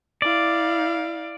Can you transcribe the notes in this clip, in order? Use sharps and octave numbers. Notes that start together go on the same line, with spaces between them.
E4 D5 F5